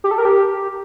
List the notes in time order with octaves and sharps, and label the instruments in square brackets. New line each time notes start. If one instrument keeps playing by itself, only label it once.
[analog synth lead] G4
A4
A#4
G4